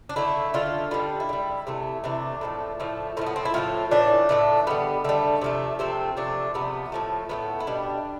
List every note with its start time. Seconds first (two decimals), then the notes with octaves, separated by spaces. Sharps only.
0.09 D4
0.16 D3 A3 E4
0.54 D3 A3 F4
0.91 D3 G3 B3
1.20 E4
1.29 D3
1.33 G3
1.67 C3 E3 A3
2.04 C3 E3 A3 D4
2.41 A2 F3 A3
2.80 A2 F3 A3
3.17 A2 F3 A3 C4
3.26 B3
3.36 C4
3.45 E4
3.54 A2 F3 A3 F4
3.91 A2 E3 A3 D4
4.29 A2 E3 A3
4.67 D3 G3 B3
5.04 D3 G3 A3
5.41 C3 F3 A3
5.79 C3 F3 A3 C4
6.17 C3 F3 A3 D4
6.54 C3 F3 A3 B3
6.92 A2 F3 A3
7.29 A2 F3 A3 B3
7.60 E4
7.67 B2 G3 D4